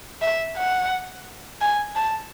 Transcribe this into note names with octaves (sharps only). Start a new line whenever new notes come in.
E5
F#5
G#5
A5